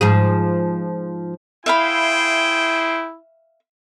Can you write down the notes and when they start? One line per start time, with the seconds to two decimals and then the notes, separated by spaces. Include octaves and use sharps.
0.01 G#2 F3 G#4
1.66 E4 G#4 C5 E5 F5 G5 B5